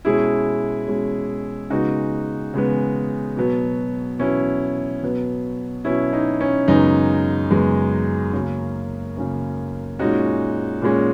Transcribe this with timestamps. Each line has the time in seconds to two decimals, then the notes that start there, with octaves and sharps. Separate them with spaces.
0.05 B2 G#3 C#4 E4 G#4
0.88 B2 G#3 C#4
1.70 C#3 G#3 B3 D#4 F#4
2.54 C#3 G#3 B3
3.37 B2 F#3 B3
4.19 B2 F#3 B3 C#4 E4
5.02 B2 F#3 B3
5.85 B2 F#3 B3 C#4 E4
6.13 D#4
6.41 C#4
6.68 F#2 C#3 G#3 B3 D#4
7.50 F#2 C#3 G#3 B3
8.33 C#3 F#3 A#3 C#4
9.16 C#3 F#3 A#3 C#4
9.99 A#2 G#3 C#4 D#4 F#4
10.82 A#2 G#3 C#4